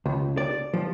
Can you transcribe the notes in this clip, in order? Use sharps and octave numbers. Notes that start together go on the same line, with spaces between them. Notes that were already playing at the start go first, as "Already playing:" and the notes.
C#2
D5
F3